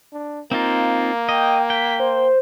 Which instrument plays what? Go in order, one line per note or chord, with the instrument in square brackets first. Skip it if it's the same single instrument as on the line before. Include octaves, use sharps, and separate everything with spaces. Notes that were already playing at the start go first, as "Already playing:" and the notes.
[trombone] D4
[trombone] A#3 [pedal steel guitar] C4 D#4 F4
[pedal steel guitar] D#5 [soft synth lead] G5
[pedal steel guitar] G5 [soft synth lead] B6
[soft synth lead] C5